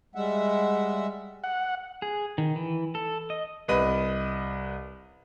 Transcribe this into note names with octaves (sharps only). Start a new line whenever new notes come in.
G3 G#3 E5 F#5
F#5
G#4
D#3
E3
A4
D#5
C2 B4 D#5 B5 D#7